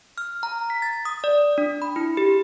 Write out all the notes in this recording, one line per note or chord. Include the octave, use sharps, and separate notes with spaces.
F6
A#5
B6
A6
D#6
D5
D4
B5
E4
G4